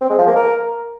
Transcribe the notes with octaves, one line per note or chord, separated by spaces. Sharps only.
C4
G#3
F3
A#3
A#4